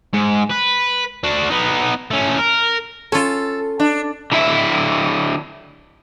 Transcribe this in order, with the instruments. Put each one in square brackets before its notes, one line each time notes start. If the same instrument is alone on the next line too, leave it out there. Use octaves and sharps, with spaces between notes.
[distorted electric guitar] G#2
B4
D4 F#4
B3 D#4
A3 C#4
A#4
[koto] C#4 F4 [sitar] A4
[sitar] D4
[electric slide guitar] D3 E4 E5